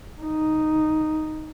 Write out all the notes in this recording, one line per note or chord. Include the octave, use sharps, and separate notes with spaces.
D#4